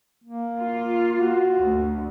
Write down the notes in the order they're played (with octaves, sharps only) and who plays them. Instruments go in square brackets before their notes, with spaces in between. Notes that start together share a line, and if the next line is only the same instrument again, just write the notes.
[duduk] A#3
[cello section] F4
[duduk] F#4
[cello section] D2